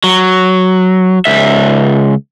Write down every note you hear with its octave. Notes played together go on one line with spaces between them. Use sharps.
F#3
C#2 E5